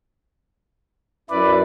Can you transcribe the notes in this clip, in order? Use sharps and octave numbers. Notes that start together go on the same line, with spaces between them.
F#2 E4 B4 D5